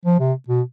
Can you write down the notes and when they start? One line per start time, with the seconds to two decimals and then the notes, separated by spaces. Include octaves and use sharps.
0.06 F3
0.20 C3
0.49 B2